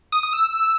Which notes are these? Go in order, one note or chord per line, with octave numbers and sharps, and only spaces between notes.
D#6
D#6
E6